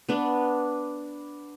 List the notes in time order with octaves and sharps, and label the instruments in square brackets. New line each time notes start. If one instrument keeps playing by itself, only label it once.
[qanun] B3 D4